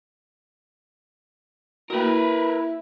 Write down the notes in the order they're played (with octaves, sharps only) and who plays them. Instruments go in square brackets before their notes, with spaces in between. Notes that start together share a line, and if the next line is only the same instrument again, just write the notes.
[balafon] A#3 F#4 [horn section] E4 [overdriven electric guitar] A#4 B4